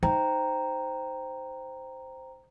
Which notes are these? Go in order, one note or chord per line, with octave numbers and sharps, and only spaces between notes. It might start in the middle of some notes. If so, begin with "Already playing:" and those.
D#4 C5 G5 A#5